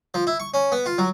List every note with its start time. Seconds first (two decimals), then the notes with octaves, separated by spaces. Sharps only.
0.14 F3
0.27 E4
0.40 C#6
0.54 C#4
0.72 B3
0.86 F4
0.98 F#3